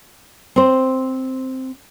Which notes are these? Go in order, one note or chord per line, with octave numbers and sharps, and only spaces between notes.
C4 C5